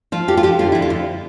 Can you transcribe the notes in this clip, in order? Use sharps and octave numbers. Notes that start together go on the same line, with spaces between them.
F3 F4
F2 G4
F4
F2 G4
D3 F4
F2 E4
F4
F2